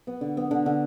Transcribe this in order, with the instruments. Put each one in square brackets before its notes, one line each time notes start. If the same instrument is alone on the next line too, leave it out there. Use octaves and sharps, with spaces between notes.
[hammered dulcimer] B3
D3
B3
D3
D3